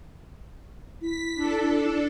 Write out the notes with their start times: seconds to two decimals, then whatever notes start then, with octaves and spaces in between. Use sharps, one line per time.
1.01 E4 B6
1.35 D4 A4